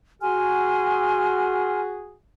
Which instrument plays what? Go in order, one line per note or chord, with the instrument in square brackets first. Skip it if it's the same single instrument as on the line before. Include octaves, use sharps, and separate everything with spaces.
[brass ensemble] F#4 G#4 [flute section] G#5 C6 F6